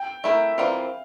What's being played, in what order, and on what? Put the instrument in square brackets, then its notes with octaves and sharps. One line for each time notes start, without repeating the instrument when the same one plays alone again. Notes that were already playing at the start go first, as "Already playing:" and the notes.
Already playing: [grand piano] G5
[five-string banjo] A3 E4 A#4 [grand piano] E5
[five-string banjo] E3 G3 C4 F4 A#4 [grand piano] F5